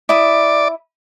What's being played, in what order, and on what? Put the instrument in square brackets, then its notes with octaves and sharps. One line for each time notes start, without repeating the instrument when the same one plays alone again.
[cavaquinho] E4 D#6 [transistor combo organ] D5